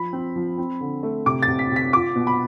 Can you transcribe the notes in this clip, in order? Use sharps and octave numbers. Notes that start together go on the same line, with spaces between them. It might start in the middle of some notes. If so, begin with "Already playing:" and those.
Already playing: F3 B5
C4
F3
C4
D3
A3
C3 D6
A6
C3
B6
C3 B6
F4 D6
B2
B5